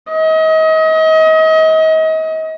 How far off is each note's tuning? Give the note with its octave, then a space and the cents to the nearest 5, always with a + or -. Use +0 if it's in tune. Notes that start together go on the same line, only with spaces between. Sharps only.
D#5 +35